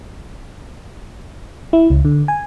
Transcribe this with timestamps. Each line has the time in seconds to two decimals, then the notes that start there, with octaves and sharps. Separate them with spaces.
1.73 E4
1.90 C#2
2.05 D3
2.28 G#5